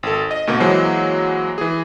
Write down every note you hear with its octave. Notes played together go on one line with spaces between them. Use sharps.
G#1 A4
D#5
D2 B2 A#3
E3 F#3 G#3 A#3 C5
E3 G#4